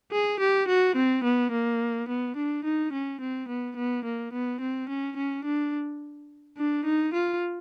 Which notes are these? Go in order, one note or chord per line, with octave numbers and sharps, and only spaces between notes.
G#4
G4
F#4
C4
B3
A#3
B3
D4
D#4
C#4
C4
B3
B3
A#3
B3
C4
C#4
C#4
D4
D4
D#4
F4